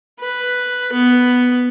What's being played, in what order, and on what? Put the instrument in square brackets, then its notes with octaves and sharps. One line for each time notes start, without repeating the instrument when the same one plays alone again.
[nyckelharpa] B4
B3